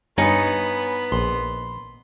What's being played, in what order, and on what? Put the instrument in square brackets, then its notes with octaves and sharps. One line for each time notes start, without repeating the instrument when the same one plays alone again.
[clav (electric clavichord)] G2 [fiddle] B3 B5 [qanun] D#4 [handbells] C#5 G#5 C#7
[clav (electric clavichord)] A#1 [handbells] C6